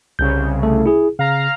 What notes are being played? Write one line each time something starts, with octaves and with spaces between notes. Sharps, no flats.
C2 C#3 G6
A3 A4
E4 G#4
C#3 F5 A#5 F6